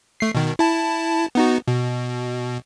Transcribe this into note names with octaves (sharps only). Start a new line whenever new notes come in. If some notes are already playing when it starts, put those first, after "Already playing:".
A3 C7
B2 D#3
E4 A5
B3 D#4 F#4
B2